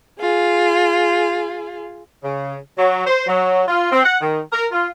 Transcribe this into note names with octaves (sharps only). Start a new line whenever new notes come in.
F4 G#4
C#3
F#3
C5
F#3
F4
C4
F#5
D#3
A#4
F4